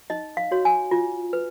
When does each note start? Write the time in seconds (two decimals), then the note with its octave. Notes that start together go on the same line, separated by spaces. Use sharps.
0.10 D#4 D#5
0.37 F5
0.51 F#4 C#5
0.65 G#5
0.91 F4
1.33 B4